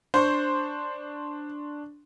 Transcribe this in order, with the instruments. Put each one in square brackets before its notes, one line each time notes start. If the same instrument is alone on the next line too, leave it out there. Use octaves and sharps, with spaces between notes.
[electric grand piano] D4 C6 C#6 [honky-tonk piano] C5